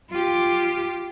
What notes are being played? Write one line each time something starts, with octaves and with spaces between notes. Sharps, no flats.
F4 G4